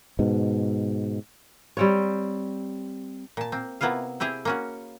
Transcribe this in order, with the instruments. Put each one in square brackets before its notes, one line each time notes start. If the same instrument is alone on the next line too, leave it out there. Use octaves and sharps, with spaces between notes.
[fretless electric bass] G#2 B2
[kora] G3 C4 C#5
[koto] A#2 A5
A#3 C4
C3 A#3 B3 E4 F4 F5
C4 E4 G4 G#4
A#3 C#4 F#4